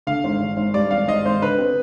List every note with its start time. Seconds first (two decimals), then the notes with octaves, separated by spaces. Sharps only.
0.07 D3 F5
0.24 G#1
0.40 G#1
0.57 G#1
0.74 G2 D5
0.91 G#1 F5
1.07 G#1 D#5
1.25 G#1 C5
1.42 D3 B4
1.58 C4